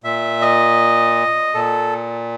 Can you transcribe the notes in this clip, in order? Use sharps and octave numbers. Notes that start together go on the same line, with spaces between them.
A#2 E5
D#5
A#2 A4